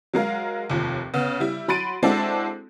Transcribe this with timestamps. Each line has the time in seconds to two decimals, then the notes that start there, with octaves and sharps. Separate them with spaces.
0.14 F#3 G#3 A#4 F5
0.70 F1 D#2 F3
1.14 C#3 B3
1.40 G3 E4
1.68 F#3 B5 C6 A6 D7 D#7
2.03 G#3 C4 D4 E4 F#4 A4